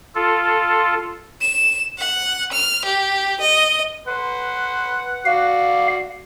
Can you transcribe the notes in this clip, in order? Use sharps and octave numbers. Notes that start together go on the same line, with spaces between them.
F4 A4
E7
F#5
F6
G4
D#5
B4 F#5 C6
F#4 D5 F5